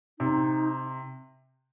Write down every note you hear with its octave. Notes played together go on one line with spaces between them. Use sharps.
C3 D#4